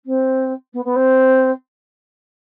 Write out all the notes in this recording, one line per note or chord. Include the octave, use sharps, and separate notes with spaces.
C4
B3
B3
C4